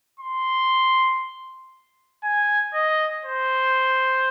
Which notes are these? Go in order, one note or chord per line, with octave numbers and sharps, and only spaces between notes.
C6
G#5
D#5
C5